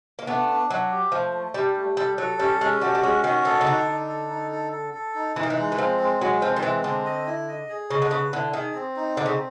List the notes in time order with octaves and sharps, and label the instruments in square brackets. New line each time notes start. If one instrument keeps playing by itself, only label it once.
[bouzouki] A#3
[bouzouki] A3 B3 [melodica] D4
[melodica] D4
[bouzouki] F#3 [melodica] D4
[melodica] G4
[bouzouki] F3 [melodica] A3
[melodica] A3
[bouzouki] G3 [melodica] D4
[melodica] A3
[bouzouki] G3 [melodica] A4
[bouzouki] F#3 [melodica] A4
[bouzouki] G3 [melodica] C#4
[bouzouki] G#3 [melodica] C#4
[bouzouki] G3 A3 [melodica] F#4
[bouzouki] G3
[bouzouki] G#3 [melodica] C#4
[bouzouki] D#3 [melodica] F#4
[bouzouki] D#3 [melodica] A4
[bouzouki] C#3
[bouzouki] D3 [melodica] D#4
[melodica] D#4
A4
D#4
A4
A4
A4
D#4
[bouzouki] E3 [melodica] D#4
[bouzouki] D#3
E3
[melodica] G#3
[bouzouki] E3
[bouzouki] F3 [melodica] C4
[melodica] G#3
[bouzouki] F#3 [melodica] G#3
[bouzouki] F3 [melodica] C4
[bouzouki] D#3
[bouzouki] E3 [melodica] G#3
[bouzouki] D3 [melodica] C4
[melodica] D#5
E4
D#5
G#4
[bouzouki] C#3 [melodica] D#5
[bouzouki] D3
[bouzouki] C#3 [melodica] B4
[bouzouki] D3 [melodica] E4
[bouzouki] D#3 [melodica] G#4
[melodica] C4
D#4
[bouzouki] D3 [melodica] C4
[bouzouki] C#3